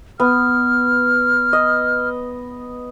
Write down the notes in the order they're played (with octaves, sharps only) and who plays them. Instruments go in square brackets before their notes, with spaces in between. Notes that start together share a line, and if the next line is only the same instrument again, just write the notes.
[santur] B3 [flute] F6
[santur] D#5